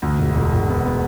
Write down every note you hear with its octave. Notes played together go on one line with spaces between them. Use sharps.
D2
E1
E1
E1
B3
B3